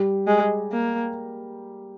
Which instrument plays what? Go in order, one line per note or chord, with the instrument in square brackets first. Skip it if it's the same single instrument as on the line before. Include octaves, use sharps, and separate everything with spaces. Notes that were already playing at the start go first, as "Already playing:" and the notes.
Already playing: [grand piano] G3 G4
[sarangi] G#3
A#3